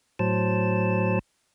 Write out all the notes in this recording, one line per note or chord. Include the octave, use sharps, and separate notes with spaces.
A2 F#3 C5 A5